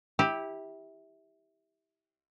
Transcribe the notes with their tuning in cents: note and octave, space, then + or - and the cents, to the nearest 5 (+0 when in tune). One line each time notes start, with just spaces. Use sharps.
E4 -20 G4 +10